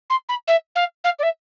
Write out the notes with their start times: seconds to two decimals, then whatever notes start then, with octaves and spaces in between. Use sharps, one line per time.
0.09 C6
0.28 B5
0.47 E5
0.75 F5
1.04 F5
1.19 D5
1.23 E5